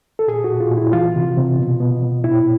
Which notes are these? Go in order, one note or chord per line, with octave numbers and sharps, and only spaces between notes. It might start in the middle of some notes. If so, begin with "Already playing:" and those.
A4
A#2 G#4
A#2 F#4
F4
A#2
E4
E3 F4
C3
C3
B2
B2
B2
A#2 E4